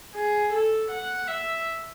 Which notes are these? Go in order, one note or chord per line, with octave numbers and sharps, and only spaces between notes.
G#4
A4
F#5
E5